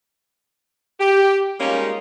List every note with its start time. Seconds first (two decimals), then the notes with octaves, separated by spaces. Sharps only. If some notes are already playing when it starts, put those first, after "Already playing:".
0.99 G4
1.60 G3 G#3 A#3 C#4 D#4 F4